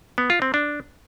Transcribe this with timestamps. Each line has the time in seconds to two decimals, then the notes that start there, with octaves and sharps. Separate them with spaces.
0.18 B3
0.30 F4
0.42 C4
0.54 D4